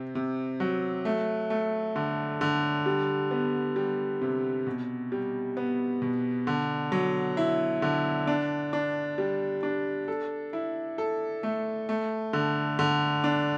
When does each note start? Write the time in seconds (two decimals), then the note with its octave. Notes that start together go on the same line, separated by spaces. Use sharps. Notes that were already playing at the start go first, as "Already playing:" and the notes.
Already playing: C3 C4
0.15 C3
0.60 F#3
1.05 A3
1.50 A3
1.96 D3
2.41 D3
2.86 G3
3.31 B3
3.76 G3
4.21 C3
4.67 B2
5.12 G3
5.57 B3
6.02 B2
6.47 D3
6.92 F#3
7.37 E4
7.82 D3
8.27 D4
8.73 D4
9.18 G3
9.63 D4
10.08 A4
10.53 E4
10.98 A4
11.43 A3
11.89 A3
12.33 D3
12.79 D3
13.24 D4